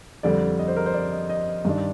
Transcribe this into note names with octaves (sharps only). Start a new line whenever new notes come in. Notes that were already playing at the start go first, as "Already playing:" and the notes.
F2 D3 G3 D5
D#5
C5
A#4
C5
D5
D#5
D#5
G2 D#3 G3 D4